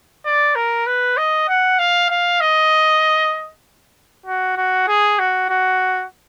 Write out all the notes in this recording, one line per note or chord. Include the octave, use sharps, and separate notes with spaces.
D5
A#4
B4
D#5
F#5
F5
F5
D#5
F#4
F#4
G#4
F#4
F#4